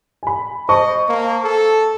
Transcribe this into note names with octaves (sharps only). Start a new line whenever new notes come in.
G#5 B5
C5 D#5 A5 C#6
A#3
A4